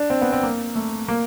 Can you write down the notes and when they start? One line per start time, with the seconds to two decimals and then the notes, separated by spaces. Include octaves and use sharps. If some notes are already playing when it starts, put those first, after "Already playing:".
Already playing: D4
0.10 C4
0.22 B3
0.32 C4
0.43 A#3
0.76 A3
1.08 A#3